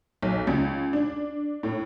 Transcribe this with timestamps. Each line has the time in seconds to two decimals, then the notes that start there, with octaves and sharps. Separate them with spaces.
0.22 B1
0.47 C#2
0.93 D4
1.63 A2